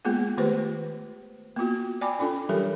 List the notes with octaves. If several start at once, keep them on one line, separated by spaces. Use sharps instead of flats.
G#3 A#3 B3 F4 G#4 F#5
D#3 A3 F4 G4 B4 C5
A#3 B3 F4 F#4
D5 G5 G#5 B5 D6
C#4 D4 F4 A4
E3 F#3 G3 G4 A4 A#4